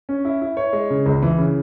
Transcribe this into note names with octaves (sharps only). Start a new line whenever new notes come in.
C#4
E4
E4
C#5
G#3
C#3
C#2
E3
C#3